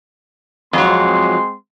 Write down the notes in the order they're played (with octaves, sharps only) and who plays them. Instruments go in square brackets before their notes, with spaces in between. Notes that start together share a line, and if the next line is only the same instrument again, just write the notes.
[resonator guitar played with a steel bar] F2 F#3 [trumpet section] G#3 C4 C6